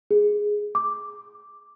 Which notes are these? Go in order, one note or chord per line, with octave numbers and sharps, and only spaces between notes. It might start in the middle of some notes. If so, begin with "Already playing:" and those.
G#4
D6